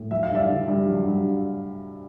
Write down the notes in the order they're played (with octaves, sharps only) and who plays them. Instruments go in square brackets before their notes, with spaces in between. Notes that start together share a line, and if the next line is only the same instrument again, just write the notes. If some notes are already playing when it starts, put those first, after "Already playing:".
Already playing: [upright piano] A2
F#3 E5
F5
G2 D5 E5
D3
G2
F#3
G2